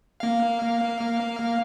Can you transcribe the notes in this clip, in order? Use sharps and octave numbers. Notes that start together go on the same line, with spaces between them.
A#3 F5